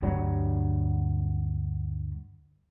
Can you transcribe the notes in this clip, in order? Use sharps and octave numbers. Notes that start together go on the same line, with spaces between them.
D2 G2 F#3 G3